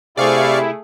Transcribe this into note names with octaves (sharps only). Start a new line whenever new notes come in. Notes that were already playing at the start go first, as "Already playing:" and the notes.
C3 A3 E4 G#4 D5 F5 C#6